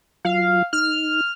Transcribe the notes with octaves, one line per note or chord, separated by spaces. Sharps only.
F#3 F4 F5
D#4 F6